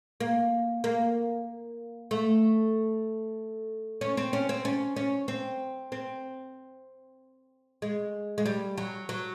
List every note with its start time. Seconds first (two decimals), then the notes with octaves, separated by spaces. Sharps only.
0.20 A#3
0.84 A#3
2.11 A3
4.01 C#4
4.17 C4
4.33 C#4
4.49 C4
4.65 C#4
4.96 C#4
5.28 C4
5.92 C4
7.82 G#3
8.38 G#3
8.46 G3
8.77 F#3
9.09 F#3